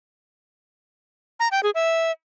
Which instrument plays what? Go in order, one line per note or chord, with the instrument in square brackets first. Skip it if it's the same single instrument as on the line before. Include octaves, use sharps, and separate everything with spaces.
[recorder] A#5
G5
G#4
E5